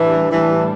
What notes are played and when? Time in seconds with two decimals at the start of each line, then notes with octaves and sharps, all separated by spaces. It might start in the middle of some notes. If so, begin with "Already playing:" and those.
Already playing: A2 E3 G3 D4
0.31 E3